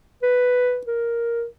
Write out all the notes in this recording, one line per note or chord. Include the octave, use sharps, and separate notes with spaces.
B4
A#4